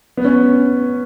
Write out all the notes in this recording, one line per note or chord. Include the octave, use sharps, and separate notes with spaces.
B3
C#4